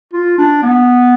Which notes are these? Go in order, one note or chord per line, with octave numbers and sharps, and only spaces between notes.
F4
D4
B3